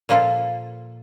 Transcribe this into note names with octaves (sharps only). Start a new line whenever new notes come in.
A#2 F3 A#3 F4 A4